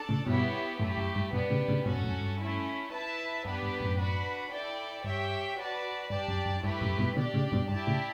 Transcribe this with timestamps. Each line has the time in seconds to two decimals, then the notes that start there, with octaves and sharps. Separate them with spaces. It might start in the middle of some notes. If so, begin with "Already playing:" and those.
Already playing: D4 A4 D5 A5
0.09 A2 C#3
0.26 G2 B2 B3 E4 G4 C#5
0.79 F#2 A2 A3 E4 G4
0.97 F#2
1.15 G2
1.32 G2 B2 B3 D4 G4
1.50 A2 C#3
1.68 A2 C#3
1.86 G2 B2 C#4 F#4 A4
1.97 G2
2.04 F#2 A2
2.21 G2
2.39 A3 C#4 E4
2.92 E4 B4 E5 A5
3.45 F#2 B3 D4 G4 B4
3.63 G2
3.80 F#2 A2
3.98 D4 F#4 B4
4.51 E4 A4 D5 G5
5.04 G2 G4 C#5 E5 G5
5.57 F#4 B4 D5 A5
6.10 G2 D4 G4 D5 A5
6.28 F#2
6.46 F#2
6.63 G2 A3 E4 G4 B4
6.81 F#2 A2
6.98 G2 B2
7.16 B2 D3 D4 G4 D5
7.34 A2 C#3
7.52 G2 B2
7.69 G2 E4 G4 D5 A5
7.87 A2 C#3